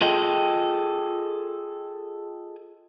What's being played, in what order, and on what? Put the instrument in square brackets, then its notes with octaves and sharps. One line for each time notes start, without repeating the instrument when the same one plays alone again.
[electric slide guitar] F4 G#4 A4 D#5 G5